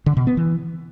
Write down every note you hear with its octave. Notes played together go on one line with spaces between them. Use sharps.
D3
B2
B3
E3